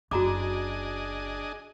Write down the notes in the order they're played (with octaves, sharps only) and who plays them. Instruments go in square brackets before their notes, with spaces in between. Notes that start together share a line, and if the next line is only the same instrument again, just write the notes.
[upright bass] F#1 [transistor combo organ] D4 G#4 D#5 [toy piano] F#4 A#5 D6